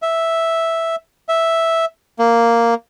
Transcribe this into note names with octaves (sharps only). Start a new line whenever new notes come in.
E5
E5
A#3